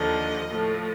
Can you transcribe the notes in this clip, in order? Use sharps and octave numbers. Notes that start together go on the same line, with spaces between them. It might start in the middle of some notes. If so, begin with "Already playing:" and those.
Already playing: D#2 D3 F3 D#5
A2 F3